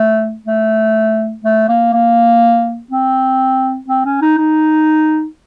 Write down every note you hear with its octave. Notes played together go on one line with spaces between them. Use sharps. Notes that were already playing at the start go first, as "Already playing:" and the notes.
Already playing: A3
A3
A3
A#3
A#3
C4
C4
C#4
D#4
D#4